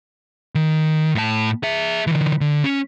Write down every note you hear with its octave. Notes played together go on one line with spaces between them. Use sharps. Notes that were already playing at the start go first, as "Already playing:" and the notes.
D#3
A2 A5
G#4 E5
D3 E3
D3
C#4